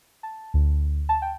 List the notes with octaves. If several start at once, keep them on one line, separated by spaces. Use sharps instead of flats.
A5
D2
A5
G5